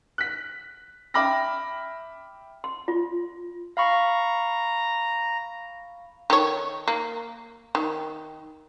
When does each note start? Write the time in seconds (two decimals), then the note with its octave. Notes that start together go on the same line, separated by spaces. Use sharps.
0.18 F#6 B6
1.14 E5 G5 B5 D6 F6 A#6
2.64 C6
2.88 F4
3.77 F5 A#5 B5 C#6
6.30 D#3 A4 C#5
6.88 A#3
7.75 D#3